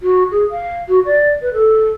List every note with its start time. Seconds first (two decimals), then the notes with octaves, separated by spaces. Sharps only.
0.02 F#4
0.31 G#4
0.51 F5
0.89 F#4
1.06 D5
1.42 B4
1.54 A4